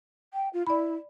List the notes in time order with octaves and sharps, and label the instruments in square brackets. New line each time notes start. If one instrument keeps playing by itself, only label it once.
[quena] G5
F4
[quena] E4 [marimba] D5 B5